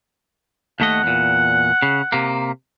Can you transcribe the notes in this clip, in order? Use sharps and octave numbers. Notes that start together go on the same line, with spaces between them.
D#2 A3 D#5 F#5
E2 A#2
C#3
C3 A#3